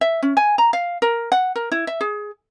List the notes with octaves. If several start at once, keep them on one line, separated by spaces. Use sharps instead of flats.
E5
C#4
G#5
A#5
F5
A#4
F#5
A#4
E4
E5
G#4